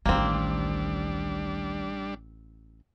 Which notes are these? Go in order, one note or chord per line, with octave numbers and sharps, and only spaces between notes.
A1 D2 D#3 G3 A#3 C4 D4